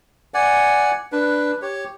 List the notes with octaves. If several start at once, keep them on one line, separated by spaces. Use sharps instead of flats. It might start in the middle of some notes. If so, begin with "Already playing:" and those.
D5 F#5 G#5
D4 B4
G4 C#5